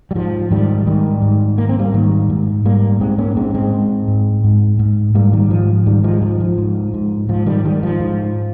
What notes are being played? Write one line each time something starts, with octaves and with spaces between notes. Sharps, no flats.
G3
G#2 F3
G#2 D#3 G3
G#2 D#3 G3
G#2
G#2 A#3
C4
G3 A#3
G#2 D#3 G3
G#2
G#2 G3 A#3
G#2 G#3 C4
A#3 C#4
G#2 G#3 C4
G#3 C4
G#2
G#2
G#2
G#2
G#2 G3 A#3
D#3 G3
G#2 F3
G#2 D#3 G3
F3 G#3
G#2 F3
F3
G#2
G#2
G#2 F3
D#3 G3
G#2 D#3 G3
F3
G#2